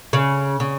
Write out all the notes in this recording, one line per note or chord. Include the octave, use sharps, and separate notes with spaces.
C#3
C#3